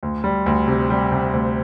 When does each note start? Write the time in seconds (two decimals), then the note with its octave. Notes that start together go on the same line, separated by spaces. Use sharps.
0.03 D2
0.24 G3
0.46 D2
0.68 C3
0.90 G3
1.12 C3
1.33 D2